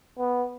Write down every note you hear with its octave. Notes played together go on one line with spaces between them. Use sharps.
B3